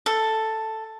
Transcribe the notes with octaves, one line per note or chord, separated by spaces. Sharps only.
A4